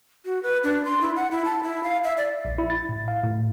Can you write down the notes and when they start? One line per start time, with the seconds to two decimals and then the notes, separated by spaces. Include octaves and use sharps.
0.25 F#4
0.43 B4
0.64 D4
0.85 C6
1.01 E4
1.16 F#5
1.31 E4
1.45 A5
1.63 E4
1.83 F5
2.04 E5
2.17 D5
2.45 A#1
2.58 E4
2.70 A6
2.89 A2
3.08 F5
3.24 A2